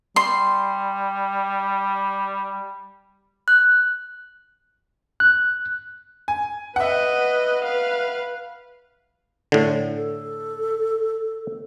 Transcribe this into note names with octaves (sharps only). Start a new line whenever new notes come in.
G3 C6
F#6
F#6
G#5
B4 D#5 E5 F#5
B4 F5
A2 D3
A4